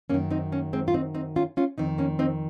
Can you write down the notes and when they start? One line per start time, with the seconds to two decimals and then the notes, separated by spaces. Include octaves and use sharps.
0.10 F#2 D#3 A#3 C#4
0.30 C4 D#4
0.52 A#3 C#4
0.73 G#3 C4
0.88 F4
0.94 C4 D#4
1.14 C4 D#4
1.36 C#4 F4
1.57 C#4 F4
1.78 F2 D#3 C4 D#4
1.98 A#3 C#4
2.19 C4 D#4